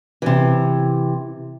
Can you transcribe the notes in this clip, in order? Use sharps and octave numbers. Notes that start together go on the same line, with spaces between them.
C3 E3